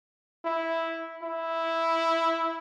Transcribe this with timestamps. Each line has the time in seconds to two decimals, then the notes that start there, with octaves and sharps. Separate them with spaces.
0.45 E4
1.23 E4